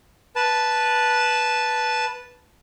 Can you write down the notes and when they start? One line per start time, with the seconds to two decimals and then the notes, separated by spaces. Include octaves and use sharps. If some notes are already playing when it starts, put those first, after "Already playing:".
0.36 B4 A5